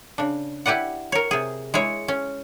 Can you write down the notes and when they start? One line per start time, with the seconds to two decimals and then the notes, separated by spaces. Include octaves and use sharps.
0.18 C#3 D4
0.66 E4 G4 B4 D5 F#5
1.12 A#4 C#5
1.31 C3 G#4
1.74 G#3 E4 C#5
2.08 C#4